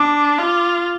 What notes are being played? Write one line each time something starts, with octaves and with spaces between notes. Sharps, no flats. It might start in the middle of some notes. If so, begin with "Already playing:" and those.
Already playing: D4 D6
F4